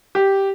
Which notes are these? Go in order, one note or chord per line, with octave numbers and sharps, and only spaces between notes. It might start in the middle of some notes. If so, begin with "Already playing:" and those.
G4